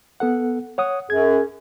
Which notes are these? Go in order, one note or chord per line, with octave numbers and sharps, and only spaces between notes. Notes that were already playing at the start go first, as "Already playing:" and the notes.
B3 A4 F#5
C#5 F#5 D#6
F#2 G#4 G#6